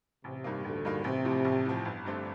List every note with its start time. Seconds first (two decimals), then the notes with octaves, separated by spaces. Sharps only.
0.24 A1 C3
0.44 G2 D#3 A#3
0.64 A1 D2 D3
0.85 G2 D#3 A#3
1.04 A1 C3
1.25 A2 F3
1.44 A1
1.65 A2 F3
1.85 G1
2.05 G2 D3 A3 C4